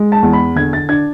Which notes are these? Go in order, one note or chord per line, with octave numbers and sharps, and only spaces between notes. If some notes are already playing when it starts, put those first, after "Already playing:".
Already playing: G#3
A5
E2
B5
D3 G#6
A6
D4 G#6